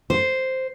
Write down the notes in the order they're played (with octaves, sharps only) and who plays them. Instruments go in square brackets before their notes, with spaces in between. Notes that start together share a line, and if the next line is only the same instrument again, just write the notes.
[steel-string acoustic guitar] C5